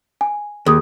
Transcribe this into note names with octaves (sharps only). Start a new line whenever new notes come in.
G#5
D#2 G#4 D#6